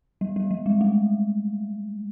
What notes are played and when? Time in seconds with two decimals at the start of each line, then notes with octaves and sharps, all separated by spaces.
0.21 G3
0.36 G3
0.51 G3
0.66 G#3
0.81 A3